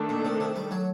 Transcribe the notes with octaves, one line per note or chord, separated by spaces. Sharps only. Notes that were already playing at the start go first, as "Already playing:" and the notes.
Already playing: D#3 A3 D4 A4
A#2
C3
C3
G3
F#3